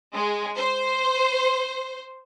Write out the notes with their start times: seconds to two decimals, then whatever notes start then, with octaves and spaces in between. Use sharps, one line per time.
0.15 G#3
0.57 C5